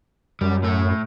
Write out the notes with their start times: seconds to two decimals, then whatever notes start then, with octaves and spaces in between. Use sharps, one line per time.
0.41 F#2 G3
0.63 A2 A3